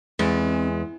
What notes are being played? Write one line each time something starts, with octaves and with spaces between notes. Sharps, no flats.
E2 G#3 C4